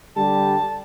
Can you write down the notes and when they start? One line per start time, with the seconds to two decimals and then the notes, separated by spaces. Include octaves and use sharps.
0.16 D3 G3 G4 A5